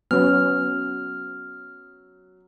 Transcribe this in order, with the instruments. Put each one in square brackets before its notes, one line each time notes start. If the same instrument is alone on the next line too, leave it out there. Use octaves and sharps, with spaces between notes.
[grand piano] F#3 [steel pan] B3 C#4 [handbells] F6